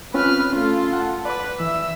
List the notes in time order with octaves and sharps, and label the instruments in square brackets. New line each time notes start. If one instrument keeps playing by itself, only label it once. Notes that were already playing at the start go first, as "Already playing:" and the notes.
[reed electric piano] C4 C#4 F4 [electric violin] B4 F6
[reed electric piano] A3 C#4 [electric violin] F4 A4
[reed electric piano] F#5 A5
[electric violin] B4 [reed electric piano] D5 D6
[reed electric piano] E3 [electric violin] E5 E6